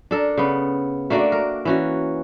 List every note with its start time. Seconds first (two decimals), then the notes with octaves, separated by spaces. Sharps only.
0.11 D4 A4 A#4
0.37 C#3 B3
1.10 A3 A#3 D4 F#4
1.32 A#4
1.65 E3 C#4 F#4